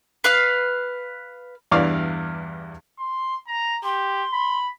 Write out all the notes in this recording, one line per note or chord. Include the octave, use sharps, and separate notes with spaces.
B4 F5 F6
E2 G2 E3 D5 F5 F6
C6
A#5
G4 C6
B5